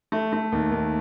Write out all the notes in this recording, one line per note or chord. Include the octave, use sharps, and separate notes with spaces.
A3
A3
D#2
D#2